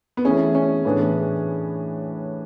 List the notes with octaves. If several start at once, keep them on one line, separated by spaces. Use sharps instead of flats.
B3
E3 A3 C#4 E4 G#4
C#4
A2 E3 B3 D4 G#4